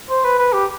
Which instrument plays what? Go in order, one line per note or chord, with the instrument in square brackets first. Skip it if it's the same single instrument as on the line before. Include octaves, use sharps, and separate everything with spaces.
[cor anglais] C5
B4
B4
G4